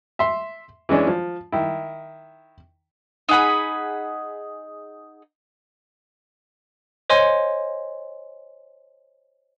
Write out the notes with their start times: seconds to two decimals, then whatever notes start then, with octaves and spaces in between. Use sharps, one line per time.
0.19 E5 C6
0.89 E3 G#3 C#4 D4
1.07 F3
1.52 D#3 E4
3.29 D#4 G#4 F#5 B5
7.10 C5 C#5 D#5 G#5 C6